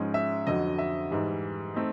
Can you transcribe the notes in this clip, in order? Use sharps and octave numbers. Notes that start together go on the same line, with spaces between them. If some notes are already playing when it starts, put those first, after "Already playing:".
Already playing: G#2 F3 G#3 C#4
E5
F2 D3 F#3 D#5
E5
G#2 E3 G3
A3 C4 D#4